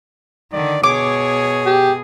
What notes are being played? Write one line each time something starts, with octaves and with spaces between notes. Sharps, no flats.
D3 D#3 D5
B2 G#4 C#5 D6
G4